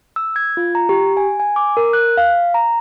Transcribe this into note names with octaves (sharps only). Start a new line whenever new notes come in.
E6
G#6
F4
A#5
G4
G#5
G#5
D6
A#4
F#6
F5
A#5